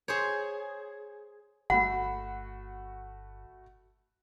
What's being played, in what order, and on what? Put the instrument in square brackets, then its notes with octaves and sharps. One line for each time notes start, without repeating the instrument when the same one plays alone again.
[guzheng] G#4 C5 C#5
[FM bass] G1 [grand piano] A3 F#4 B5 [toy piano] F#5